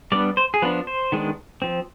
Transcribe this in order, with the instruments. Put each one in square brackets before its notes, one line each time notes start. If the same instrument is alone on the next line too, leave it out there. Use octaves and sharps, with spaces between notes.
[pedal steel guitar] G3 B3 D4 D5
C5
G#4
F3 B3 D4 B4
C5
D#3 G#3 B3 D4
F3 C4